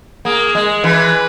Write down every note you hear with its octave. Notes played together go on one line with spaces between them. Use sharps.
A#3 G#4
G#3
E3 B4